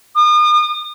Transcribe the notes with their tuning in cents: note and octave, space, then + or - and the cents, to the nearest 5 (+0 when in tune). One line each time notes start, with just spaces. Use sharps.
D#6 -40